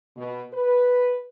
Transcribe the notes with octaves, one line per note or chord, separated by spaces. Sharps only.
B2
B4